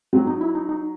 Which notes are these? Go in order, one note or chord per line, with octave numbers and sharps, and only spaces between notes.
F#3 C4
D#4
E4
D#4
D#4